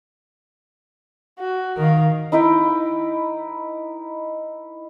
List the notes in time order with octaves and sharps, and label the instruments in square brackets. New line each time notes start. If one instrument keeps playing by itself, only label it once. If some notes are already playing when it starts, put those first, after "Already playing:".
[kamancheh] F#4
[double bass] D#3 [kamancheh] A#4 F5
[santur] D#4 E4 B4 G5